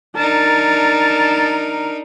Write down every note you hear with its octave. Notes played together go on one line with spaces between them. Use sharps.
D4 D#4 A#4 A5